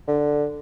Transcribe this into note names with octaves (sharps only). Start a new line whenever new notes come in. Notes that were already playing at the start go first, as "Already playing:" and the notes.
D3